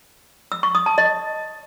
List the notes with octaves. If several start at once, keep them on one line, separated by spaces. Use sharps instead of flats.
E6
C#6
D#6
A5
D#5